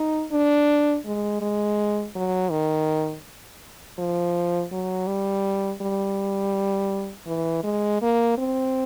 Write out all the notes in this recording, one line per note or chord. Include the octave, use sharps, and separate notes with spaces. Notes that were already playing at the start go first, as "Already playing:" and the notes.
Already playing: D#4
D4
G#3
G#3
F#3
D#3
F3
F#3
G3
G3
E3
G#3
A#3
C4